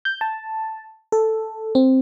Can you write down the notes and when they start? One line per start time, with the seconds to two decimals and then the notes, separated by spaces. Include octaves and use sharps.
0.05 G6
0.21 A5
1.12 A4
1.75 C4